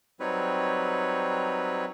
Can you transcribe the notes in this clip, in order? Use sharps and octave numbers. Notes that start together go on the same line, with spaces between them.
F#3 G3 C4 D#4 B4 C#5